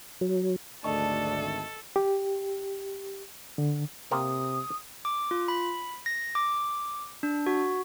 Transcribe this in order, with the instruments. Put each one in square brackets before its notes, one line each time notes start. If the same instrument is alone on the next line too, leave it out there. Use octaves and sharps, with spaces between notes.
[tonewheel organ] F#3
[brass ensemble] G#1 D2 A3 [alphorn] D4 [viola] A4 [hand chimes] D#5 A5 C#6
[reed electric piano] G4
D3
[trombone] C3 [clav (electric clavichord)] A#3 C4 A#4 [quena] D#6
[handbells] D6
F4
B5
A#6
D6
D4
F#4